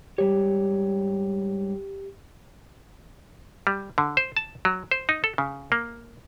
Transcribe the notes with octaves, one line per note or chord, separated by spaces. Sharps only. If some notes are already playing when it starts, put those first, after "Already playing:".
G#2 G3 G4 C#5
G3
D3
C5
A5
F#3
C5
D#4
A4
C#3
A#3